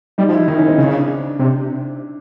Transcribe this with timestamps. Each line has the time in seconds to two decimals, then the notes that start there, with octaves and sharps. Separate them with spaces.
0.18 G3 D#4
0.29 F3
0.33 E4
0.48 D#3 D#4
0.58 C#4
0.68 C4
0.78 C#3
0.93 D4
1.39 C3